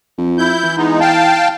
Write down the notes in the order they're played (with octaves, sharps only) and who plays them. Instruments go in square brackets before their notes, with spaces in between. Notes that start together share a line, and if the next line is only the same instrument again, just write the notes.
[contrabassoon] F2
[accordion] E4 G6
[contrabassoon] E3
[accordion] G#3 B3 D#4
F5 G5 A5